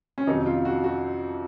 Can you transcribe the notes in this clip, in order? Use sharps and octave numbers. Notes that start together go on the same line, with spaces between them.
C#4
F2 C3 D#3 F#3 D#4
F4
F#4
F#4